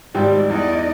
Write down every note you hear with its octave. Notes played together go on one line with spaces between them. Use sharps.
G#1 G3 G4 D5
E2 D#4 D5 D#5